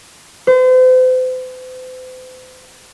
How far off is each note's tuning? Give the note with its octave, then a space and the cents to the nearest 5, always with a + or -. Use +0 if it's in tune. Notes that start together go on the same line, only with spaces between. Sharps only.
C5 -40